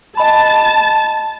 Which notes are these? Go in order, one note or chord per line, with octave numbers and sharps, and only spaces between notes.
D#5 G#5 A5 B5